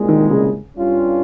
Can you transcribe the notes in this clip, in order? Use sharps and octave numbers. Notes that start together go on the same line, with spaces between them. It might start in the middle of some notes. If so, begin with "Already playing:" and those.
Already playing: C2 A#2 G#3
D#3
C#3
G2 G3 C#4 F4